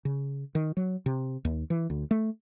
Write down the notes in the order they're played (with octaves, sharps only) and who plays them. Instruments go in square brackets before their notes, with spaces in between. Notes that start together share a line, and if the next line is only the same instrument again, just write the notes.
[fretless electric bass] C#3
D#3
F#3
C3
D#2
E3
D2
A3